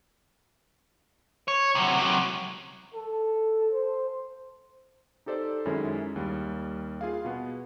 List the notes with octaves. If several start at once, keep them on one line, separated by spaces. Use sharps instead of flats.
C#5
C3 F#3
C3 F#3
A4
C5
D#4 G4 A4 C5 D5
F#2 D#3 G#3 C#4 E4
D#2 G3
F4 G#4 F5
B2 B3